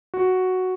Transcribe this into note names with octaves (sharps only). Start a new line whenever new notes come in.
F#4